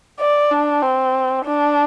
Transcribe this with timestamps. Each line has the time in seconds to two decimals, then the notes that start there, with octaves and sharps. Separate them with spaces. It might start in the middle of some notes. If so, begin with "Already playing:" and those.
0.20 D5
0.51 D4
0.83 C4
1.45 D4